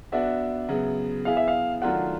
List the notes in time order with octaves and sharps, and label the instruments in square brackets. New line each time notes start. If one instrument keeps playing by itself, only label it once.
[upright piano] B3 D4 F#4 [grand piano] E5
[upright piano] C#3 F#3 B3
[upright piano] B3 E4 G#4 [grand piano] F5
[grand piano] E5
F5
[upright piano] D#3 F#3 A3 D4 F4 [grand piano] F#5